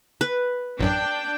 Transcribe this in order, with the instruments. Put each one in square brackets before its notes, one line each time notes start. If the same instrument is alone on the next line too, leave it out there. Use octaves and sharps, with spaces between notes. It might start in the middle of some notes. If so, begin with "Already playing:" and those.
[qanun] B4
[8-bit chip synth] A1 F#2 [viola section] D4 G5